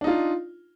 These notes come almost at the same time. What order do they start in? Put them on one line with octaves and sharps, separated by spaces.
D4 D#4 F4